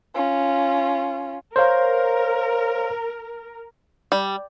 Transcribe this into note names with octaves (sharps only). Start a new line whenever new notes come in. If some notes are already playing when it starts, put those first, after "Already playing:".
C#4 F4
A#4 C5 C#5 F5
G3